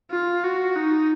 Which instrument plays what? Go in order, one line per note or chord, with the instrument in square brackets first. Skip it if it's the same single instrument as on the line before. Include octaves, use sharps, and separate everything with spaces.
[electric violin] F4
F#4
D#4